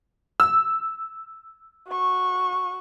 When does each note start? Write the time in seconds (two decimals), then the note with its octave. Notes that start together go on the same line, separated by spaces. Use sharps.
0.40 E6
1.88 F#4 C#6